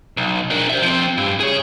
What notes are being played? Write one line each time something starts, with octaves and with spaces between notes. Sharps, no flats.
B1
D4 A#4
C5 E5
F3 C4
G2
G#4 C#5